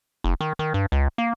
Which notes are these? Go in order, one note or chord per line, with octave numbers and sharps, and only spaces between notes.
F1
D#3
D#3
G2
C#2
A#3